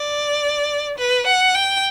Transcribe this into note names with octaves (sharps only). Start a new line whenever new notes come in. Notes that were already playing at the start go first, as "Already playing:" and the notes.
Already playing: D5
B4
F#5
G5